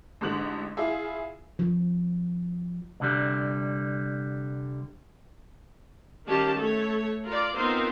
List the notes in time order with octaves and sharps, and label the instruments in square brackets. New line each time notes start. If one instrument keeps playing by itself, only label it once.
[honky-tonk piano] A1 G#2 D3 F#6 F#7
E4 F4 G#4 E5
[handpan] F3
[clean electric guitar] C2 D3 G3
[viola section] D#3 G3 C#4 G4 F5 A5
A3 A4 C#5
F4 A#4 D5
B3 C4 D#4 F4 A#4 C5